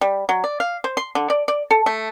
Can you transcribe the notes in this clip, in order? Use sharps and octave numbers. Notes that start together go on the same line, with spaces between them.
G3
F#3
D5
F5
C5
C6
D3
D5
D5
A4
A3